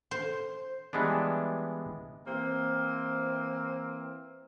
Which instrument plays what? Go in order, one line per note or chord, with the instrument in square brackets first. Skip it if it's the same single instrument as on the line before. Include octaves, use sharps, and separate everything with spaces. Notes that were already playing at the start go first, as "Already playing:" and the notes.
[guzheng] C5
[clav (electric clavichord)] E3 G3 G#3 B3 D4
[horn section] E3 A#3 C4